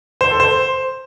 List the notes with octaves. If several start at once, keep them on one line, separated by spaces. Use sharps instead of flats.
C5
A4
C5